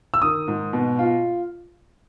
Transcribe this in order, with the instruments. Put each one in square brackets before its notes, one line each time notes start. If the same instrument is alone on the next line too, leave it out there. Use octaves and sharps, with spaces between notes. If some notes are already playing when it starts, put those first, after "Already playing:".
[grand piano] E6
[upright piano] D#3 [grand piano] D#6
[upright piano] G#2
B2
F4